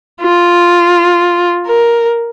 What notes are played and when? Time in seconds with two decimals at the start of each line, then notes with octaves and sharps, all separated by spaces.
0.22 F4
1.66 A#4